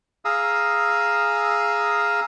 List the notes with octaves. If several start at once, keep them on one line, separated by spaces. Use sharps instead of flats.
G#4 F5 A#5 D#6 E6